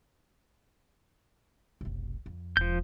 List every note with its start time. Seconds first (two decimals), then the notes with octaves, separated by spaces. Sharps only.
1.81 F1 B1
2.26 F2
2.57 E1 F3 G6